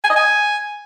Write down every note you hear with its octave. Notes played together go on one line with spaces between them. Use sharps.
G#5
D#5
G#5